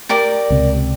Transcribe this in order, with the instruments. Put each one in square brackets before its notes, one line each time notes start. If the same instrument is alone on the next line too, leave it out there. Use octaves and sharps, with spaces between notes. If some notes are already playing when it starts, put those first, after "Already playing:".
[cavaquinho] G4 A#4 D5
[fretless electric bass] C#2 C3